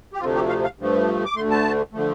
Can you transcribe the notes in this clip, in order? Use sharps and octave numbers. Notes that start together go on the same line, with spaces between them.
G4
D2 C3 F3 A3 F4
G4
F5
F5
G2 F3 A3
D6
D2 D3 A3 C6
A5
D3 F3 A3